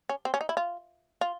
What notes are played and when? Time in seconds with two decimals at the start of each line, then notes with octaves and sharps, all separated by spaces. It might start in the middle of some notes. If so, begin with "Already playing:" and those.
0.09 C#4
0.25 C4
0.34 C#4
0.41 D#4
0.49 E4
0.57 F4
1.21 F4